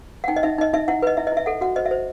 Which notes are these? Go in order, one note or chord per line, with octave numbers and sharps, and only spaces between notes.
F#5
D#4 G5
D#5
D#4 E5
D#4 D#5
D#4 E5
E4 F#5
B4 D#5
E4 E5
D#5
E4 E5
A4 F#5
F#4 F#5
C5 D#5
E5
C5